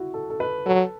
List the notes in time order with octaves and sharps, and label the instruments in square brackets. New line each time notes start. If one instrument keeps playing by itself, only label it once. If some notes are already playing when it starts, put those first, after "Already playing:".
Already playing: [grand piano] E4 F#4
A4
A4
B4
[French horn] F#3 [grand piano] A4